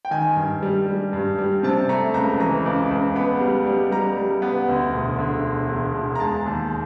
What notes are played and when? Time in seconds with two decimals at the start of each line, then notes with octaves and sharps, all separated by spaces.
0.05 G5
0.11 D#3 G#5
0.36 G2
0.63 G3
0.88 G3
1.13 G2
1.38 G3
1.63 C3 A5
1.89 A3 A#5
2.14 C#2 A#5
2.40 E3 A#5
2.66 C#2
2.91 C#2
3.15 B3 B5
3.41 G3
3.66 G3
3.91 G3 A#5
4.17 G3
4.42 B3
4.68 D2
4.94 E1
5.19 D3
5.45 E1
5.69 E1
5.94 E1
6.15 A#5
6.20 G#3 A5
6.46 D#2